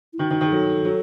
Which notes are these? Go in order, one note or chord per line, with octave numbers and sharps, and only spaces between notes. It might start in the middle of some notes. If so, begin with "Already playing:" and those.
E4
D#3 F#4
D#3
D#3
G#4
F#3 A4
F#3